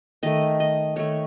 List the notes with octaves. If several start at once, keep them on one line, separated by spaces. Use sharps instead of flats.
D#3 A3 D#5
D#5
D#3 A3 C#5